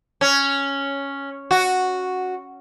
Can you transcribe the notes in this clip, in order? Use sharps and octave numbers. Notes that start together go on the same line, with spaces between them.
C#4
F#4